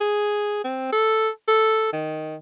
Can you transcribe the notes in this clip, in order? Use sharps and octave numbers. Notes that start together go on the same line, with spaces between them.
G#4
C4
A4
A4
D#3